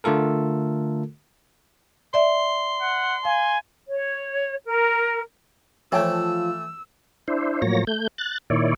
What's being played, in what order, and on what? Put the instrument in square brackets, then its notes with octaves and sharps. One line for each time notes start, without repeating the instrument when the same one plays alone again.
[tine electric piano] D3 A3 F4 A4 A#4
[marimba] D5 E5 [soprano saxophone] C6
[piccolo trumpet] F#5
[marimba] F5 [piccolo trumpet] G#5
[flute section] C#5
A#4
[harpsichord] E3 A3 [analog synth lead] F3 [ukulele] C#5 G5 A5 [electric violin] E6
[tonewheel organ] D4 E4 C5
A2 F3 F#3 A#3 C#5 A#6
A3 G6
F#6 A6
A#2 D#3 E4 C#5 D5